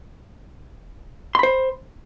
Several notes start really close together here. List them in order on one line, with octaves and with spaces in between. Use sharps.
C6 B5 C5